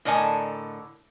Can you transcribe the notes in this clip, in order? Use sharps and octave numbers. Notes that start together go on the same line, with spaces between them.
A2 D3 A#4 D#5 G#5 A5